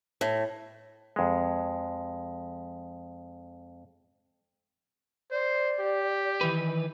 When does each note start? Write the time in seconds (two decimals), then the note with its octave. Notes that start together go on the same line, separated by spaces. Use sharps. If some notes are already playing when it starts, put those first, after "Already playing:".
0.21 A2
1.16 F2 G#3
5.31 C5 D5
5.79 G4
6.41 D#3 E3 B4